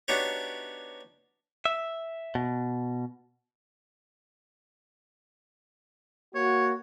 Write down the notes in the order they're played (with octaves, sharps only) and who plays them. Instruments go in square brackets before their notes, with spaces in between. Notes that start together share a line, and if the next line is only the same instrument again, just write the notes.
[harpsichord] B3 D4 D#4 F#4 G4 C#5
[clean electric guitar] E5
B2
[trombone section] A#3 F#4 [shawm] C#5